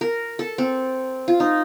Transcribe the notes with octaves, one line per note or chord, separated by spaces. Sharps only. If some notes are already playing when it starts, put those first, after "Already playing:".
A#4
A4
C4
F4
D#4